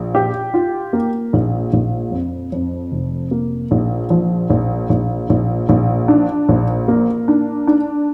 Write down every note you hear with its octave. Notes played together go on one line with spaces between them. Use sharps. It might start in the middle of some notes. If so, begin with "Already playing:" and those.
Already playing: A#1
G4
F4
A#3
A#1
A#1
F2
F2
F1
A#3
A#1
F3
A#1
A#1
A#1
A#1
D4
A#1
A#3
D4
D4